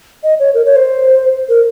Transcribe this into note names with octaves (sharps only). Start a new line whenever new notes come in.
D#5
C#5
A#4
C#5
C5
A#4